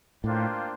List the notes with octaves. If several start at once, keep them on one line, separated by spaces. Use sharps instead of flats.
A2 A#3 D4 F4 C5 G5